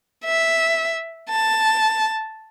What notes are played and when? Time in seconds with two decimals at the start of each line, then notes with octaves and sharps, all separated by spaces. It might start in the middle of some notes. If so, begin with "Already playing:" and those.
0.24 E5
1.30 A5